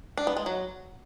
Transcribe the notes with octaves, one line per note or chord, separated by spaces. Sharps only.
D4
B3
G#3
F#3